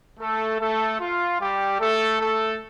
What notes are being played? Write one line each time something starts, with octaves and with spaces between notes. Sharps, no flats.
A3 A4
A3 A4
F4
G3 G4
A3 A4
A3 A4